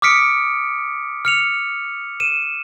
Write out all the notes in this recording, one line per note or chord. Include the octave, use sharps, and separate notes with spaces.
D6 D#6 F6 B6 C#7 D7
F6 C#7 F7
D#7 E7